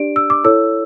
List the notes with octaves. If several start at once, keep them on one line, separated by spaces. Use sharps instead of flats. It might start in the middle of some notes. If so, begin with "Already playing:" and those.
Already playing: D4 G4 D5 D7
E6
D6
E4 A4 C#5 E6